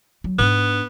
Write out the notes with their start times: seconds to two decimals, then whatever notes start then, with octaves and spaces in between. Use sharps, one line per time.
0.24 F#3
0.38 G#2 B3 D4